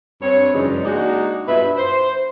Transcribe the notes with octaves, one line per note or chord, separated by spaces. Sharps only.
G2 C4 C#5
F#2 C#3 E3 G#3 D4 D#4
G#3 A#3 D4 D#4 F#4
G2 B2 F4 B4 E5
C5